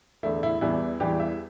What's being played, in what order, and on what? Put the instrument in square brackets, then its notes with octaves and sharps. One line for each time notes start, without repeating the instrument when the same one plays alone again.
[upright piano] E2 D3 A3 E4
E4
E2 E3 G3 B3 E4
E2 E3 G3 B3 G4
E5